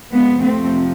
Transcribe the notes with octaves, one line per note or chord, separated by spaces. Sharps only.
F2 C3 F3 G#3 B3
A3 C4